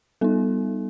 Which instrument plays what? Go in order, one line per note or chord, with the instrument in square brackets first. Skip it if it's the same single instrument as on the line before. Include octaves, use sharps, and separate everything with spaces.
[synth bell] G3 B3 D#4 A4